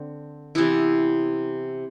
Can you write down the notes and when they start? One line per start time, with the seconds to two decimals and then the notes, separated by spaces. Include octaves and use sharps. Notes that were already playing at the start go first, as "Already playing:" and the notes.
Already playing: D3 C4
0.55 C3 E3 B3 E4